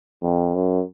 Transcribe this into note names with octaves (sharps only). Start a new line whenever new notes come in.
F2
F#2